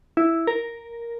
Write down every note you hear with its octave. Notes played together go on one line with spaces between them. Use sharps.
E4
A#4